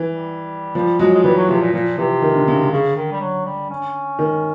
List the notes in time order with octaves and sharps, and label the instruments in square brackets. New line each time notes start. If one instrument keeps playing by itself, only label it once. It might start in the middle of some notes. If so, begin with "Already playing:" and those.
Already playing: [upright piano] E3
[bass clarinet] G3
[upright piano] F3 [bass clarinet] G3
[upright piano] F#3 [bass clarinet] G#3
[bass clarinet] G#3
[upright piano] E3 [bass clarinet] G3
[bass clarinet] F#3
[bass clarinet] C3 [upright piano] F3
[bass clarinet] A#2
[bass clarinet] A#2 [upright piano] F3
[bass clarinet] C3 [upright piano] E3
[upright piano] D#3
D3
C#3
D3
[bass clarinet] C#3
D#3
G3
F#3
G3
C#4
[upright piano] D#3